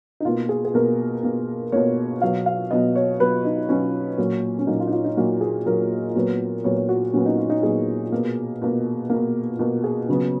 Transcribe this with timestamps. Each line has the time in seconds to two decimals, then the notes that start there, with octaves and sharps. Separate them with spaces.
0.20 D#4
0.25 B2 A#3 F4
0.49 G#4
0.65 G#4
0.74 B2 A#3 A#4
1.23 B2 A#3
1.72 B2 A#3 C#5
2.21 B2 F#3 B3 F5
2.46 F5
2.71 B2 F#3 B3 D#5
2.96 C#5
3.20 B2 F#3 B3 B4
3.45 D#4
3.69 B2 F#3 B3 C#4
4.18 A#2 F#3 A#3
4.59 C#4
4.67 A#2 F#3 A#3 D#4
4.80 F4
4.87 D#4
4.92 F4
5.04 D#4
5.17 A#2 F#3 A#3 F#4
5.41 G#4
5.66 A#2 F#3 A#3 A#4
6.16 A#2 F#3 B3
6.64 A#2 F#3 B3 C#5
6.76 C#5
6.89 F#4
7.13 A#2 F#3 B3 C#4
7.26 D#4
7.38 F4
7.50 D#4
7.63 A#2 F#3 B3 G#4
8.12 B2 A#3
8.62 B2 A#3
9.10 B2 A#3
9.59 B2 A#3
9.84 G#4
10.09 C#3 F#3 B3